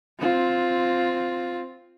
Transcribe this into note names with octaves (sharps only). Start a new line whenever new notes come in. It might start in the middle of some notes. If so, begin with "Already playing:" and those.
C4 F4